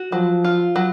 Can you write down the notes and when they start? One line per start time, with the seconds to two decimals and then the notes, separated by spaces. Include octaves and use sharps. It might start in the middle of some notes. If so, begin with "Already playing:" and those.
Already playing: F#4
0.12 F3 F#3
0.44 F4
0.76 F#3